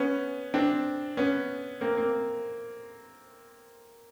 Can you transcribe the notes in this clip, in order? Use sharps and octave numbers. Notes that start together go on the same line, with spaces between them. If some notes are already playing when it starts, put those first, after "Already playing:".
Already playing: B3 C#4
C4 D4
B3 C#4
A#3 C4
A#3 C4